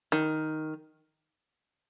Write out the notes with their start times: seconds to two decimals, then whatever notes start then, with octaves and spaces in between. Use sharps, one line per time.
0.12 D#3